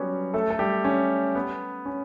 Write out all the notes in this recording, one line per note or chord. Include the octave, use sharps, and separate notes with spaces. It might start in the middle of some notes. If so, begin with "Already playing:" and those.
Already playing: F#3 G3 B3 C#4 F#4 G4 B4 C#5
A3 A4
A4
G3 G4
C#4
B3
C#4